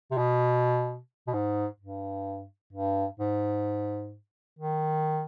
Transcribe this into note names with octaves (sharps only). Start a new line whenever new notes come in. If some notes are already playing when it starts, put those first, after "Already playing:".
C3
B2
B2
G#2
G2
G2
G#2
D#3